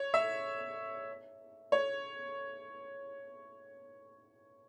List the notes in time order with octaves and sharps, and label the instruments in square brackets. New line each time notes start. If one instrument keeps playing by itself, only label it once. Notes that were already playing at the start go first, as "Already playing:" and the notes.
Already playing: [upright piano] C#5
E5
C#5